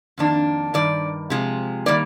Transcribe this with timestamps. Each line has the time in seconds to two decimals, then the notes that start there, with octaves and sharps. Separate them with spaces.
0.18 F2 D#3 A#3 D4
0.74 G2 D#3 D5
1.30 C3 F3 G#3
1.86 D#3 G3 A#3 D5